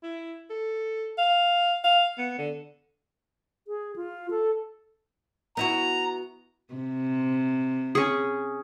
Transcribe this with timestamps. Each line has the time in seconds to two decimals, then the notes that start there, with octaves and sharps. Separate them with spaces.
0.03 E4
0.50 A4
1.18 F5
1.84 F5
2.18 B3
2.38 D3
3.67 G#4
3.96 F4
4.31 A4
5.57 B3 E4 F#4 A#5
6.74 C3
7.95 C#4 G#4